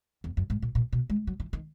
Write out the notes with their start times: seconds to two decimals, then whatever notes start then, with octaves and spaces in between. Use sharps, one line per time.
0.24 E2
0.37 F#2
0.50 G#2
0.62 A#2
0.75 A#2
0.93 B2
1.10 G#3
1.27 F#3
1.40 E3
1.53 D#3